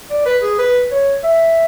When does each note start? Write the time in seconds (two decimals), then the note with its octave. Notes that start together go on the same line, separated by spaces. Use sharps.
0.10 D5
0.26 B4
0.42 G#4
0.58 B4
0.91 C#5
1.24 E5